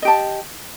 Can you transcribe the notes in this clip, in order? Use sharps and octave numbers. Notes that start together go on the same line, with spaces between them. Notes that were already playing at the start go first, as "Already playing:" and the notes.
G4 D#5 A5